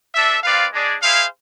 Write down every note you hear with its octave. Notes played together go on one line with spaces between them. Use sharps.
D4 A4 E5
C4 F4 B4 D5 F5
G#3 D4 G#4 D5
E4 G#4 C5 F5